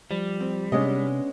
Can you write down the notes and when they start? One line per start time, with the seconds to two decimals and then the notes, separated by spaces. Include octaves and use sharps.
0.11 F3 G3
0.40 C4
0.72 C3 G#3 B3 C#4 D4 D#5